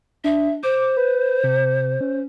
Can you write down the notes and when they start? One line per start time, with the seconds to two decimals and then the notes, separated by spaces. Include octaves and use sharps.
0.24 D4 E5
0.63 C5 D6
0.97 B4
1.44 C3
2.01 C#4